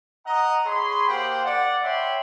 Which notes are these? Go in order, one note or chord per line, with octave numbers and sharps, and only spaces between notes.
D#5 F#5 A#5
G#4 C#5 B5 C6
A#3 G4 C5 F#5 G5
D5 F#5
C#5 E5 G5 B5 C6